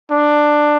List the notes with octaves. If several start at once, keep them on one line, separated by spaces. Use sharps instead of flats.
D4